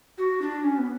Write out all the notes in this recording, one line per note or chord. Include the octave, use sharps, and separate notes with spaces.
F#4
D4
C#4
B3